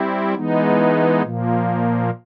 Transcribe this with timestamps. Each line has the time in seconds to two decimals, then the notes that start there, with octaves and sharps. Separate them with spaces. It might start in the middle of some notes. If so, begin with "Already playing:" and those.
Already playing: G3 C4 E4
0.34 E3 G#3 B3 D#4
1.22 A#2 F3 A#3